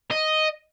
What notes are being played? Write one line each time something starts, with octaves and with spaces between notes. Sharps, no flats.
D#5